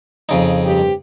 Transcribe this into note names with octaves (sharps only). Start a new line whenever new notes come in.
F2 C#3 D#4
G2 C4 G4